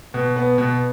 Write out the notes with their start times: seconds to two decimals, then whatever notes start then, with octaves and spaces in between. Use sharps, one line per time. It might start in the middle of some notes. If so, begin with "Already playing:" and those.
0.14 B2
0.36 B3
0.58 B2